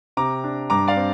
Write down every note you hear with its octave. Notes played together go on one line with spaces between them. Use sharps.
C3 A#5 D6
D4
G2 A#5 D6
D5 F5
C4